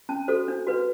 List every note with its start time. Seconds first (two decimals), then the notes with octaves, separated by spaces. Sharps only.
0.09 C#4 A5
0.28 F#4 A4 C5
0.48 D4
0.67 F#4 B4